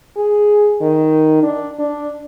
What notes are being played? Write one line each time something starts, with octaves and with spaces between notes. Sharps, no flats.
G#4
D#3
D4
D4